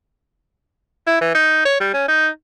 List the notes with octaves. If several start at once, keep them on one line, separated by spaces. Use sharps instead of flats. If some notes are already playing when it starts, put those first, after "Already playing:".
E4
E3
D#4
C#5
G3
C#4
D#4